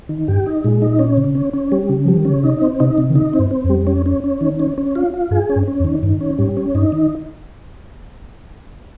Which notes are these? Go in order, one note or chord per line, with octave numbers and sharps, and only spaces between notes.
D#3
G2 G4
D#4
A#2 G#3
D#4
C#4
C#3
C#4
C#4
G3
C#3
F3 G3
D#3
C#4
C#3
C3 D#4
C4
C3 D#4
C3
D#3
C#3 D#4
C4
G2
C4
F2
G3
C#4
C#4
C#4
D#3
C#4
C#4
F4
F4
G2 G#4
C#4
G2
C#4
F2
D#3
G2 D#3
C#4
G#2 G3
C#4
G2 D#4
D#3